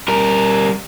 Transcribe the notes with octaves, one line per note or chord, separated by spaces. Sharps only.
G3 A#4